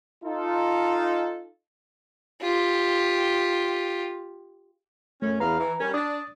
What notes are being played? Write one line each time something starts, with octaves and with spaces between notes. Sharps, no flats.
D#4 F4 A4
F4 G4
F#2 A3 C#4
E2 B4 F5 A#5
E3
G3 C#4 A#4
D4 D#6 A6